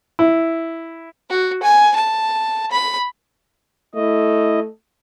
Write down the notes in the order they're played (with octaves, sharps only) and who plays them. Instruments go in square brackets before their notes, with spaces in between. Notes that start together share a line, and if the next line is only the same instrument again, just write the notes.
[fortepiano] E4
[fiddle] F#4
G#5
A5
B5
[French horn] A3 [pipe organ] E4 D#5